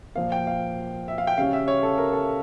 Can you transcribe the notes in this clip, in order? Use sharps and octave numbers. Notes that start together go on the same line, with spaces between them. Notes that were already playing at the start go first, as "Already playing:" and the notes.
A#2 F3 A#3 F5
G5
F5
E5
F5
G5
C#3 G3 C#4 F5
E5
C#5
A4
A#4
A4